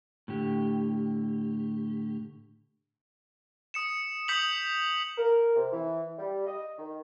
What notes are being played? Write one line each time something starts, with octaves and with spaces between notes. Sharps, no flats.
A2 D3 G4
D#6 C#7 E7
D#6 G6 B6 C#7 F7 F#7
A#4
C3
E3
G3
D#5
D#3